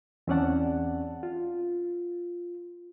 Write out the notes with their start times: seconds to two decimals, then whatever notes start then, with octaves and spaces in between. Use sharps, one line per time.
0.27 E2 C4 C#4 D5 F#5 A5
1.23 F4